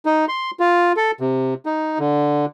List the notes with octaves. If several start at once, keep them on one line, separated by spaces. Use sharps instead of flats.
D#4
C6
F4
A4
C3
D#4
D3